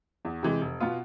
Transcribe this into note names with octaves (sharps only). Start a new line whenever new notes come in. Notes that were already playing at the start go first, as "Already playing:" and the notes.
E2
C3 E3 G#3
F1
B2 B3 F4